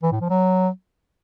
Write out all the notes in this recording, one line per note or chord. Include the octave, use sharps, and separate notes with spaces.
E3
A2
F3
F#3